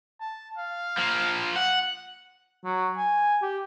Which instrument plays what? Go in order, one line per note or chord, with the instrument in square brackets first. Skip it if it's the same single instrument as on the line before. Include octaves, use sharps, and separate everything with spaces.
[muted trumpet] A5
F5
[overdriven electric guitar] F3 A#3
F#5
[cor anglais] F#3
G#5
G4